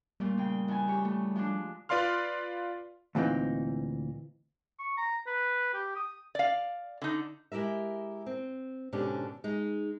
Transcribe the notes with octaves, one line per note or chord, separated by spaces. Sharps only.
A#2 G3 A3
C#3 G5
E2 G#5
G4 C#5
A3
F3 G#3 D4
F4 B4 D5 F5 C6 F6
D2 A#2 E3 C4 D#4
C#6
A#5
B4
G4
D#6
D5 F5
D3 D#4
G#3 E4 G4 A#4 E5
C4
G#2 B2 D3 C#4 D4 G4
G#3 D#4